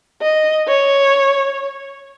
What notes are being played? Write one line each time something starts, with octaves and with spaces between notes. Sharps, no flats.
D#5
C#5